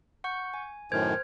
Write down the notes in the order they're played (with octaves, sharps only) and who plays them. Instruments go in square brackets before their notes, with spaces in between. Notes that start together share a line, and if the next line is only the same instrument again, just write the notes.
[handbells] F#5 C#6 G6
G#5
[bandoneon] F#2 A2 D#3 [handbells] C5 F6 [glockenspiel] G#6